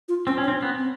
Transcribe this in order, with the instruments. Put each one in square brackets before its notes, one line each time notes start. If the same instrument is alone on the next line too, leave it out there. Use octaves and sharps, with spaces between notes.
[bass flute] F4
[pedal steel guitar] C4 [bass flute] C#4
[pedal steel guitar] C#4
[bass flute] D4
[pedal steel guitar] C4
[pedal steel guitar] B3 [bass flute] C#4
[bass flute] C4